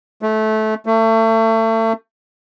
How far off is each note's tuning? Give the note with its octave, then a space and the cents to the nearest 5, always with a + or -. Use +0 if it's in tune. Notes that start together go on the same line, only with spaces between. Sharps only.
A3 -20
A3 +30